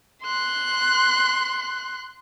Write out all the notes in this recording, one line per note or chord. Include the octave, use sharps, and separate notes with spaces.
C6 F#6